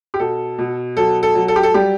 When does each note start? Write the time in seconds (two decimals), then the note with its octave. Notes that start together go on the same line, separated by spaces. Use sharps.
0.14 G4
0.19 B2 A4
0.58 B2
0.97 F#3 A4
1.23 A4
1.35 F#3
1.48 A4
1.56 G4
1.63 A4
1.74 G3 G4